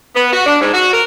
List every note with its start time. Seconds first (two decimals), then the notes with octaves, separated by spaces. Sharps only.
0.16 B3
0.33 F#4
0.46 D4
0.61 G#2
0.73 F#4
0.93 A#4